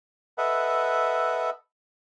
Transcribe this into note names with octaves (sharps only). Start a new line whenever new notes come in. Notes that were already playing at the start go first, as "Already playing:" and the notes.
A4 B4 D#5 E5 F#5